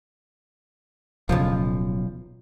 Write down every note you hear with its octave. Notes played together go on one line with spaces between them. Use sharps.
D1 B1 E2 C#3 F3